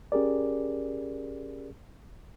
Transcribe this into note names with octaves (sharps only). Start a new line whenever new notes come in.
C#4 G4 G#4 A#4 D5